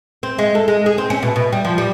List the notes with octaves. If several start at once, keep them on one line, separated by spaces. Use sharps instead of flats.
C4
G#3
A4
G#3
G#4
C4
C#4
B2
B2
G3
F3
G3